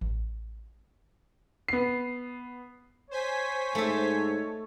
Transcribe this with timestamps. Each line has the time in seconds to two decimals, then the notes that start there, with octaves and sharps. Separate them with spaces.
0.01 A1
1.68 B3 C7
3.11 C5 C#5 G#5 B6
3.75 G#2 A3 A4